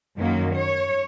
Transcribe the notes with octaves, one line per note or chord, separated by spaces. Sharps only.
F#2 D#3 F#3 A#3
C#5